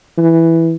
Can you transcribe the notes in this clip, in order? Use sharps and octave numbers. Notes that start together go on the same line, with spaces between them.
E3